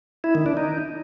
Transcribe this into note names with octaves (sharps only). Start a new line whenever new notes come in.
E4
D#3
D4
D#4